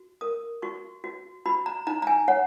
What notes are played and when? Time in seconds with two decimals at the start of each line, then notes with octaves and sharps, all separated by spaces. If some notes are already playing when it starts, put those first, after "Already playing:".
Already playing: F#4
0.21 A#4 D#6
0.62 F#4 C#6
1.04 F#4
1.45 F#4 B5
1.66 A#5
1.87 D#4 A#5
2.02 A#5
2.07 G#5
2.28 C#5 F#5